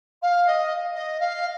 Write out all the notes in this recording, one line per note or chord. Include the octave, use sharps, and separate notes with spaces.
F5
D#5
D#5
F5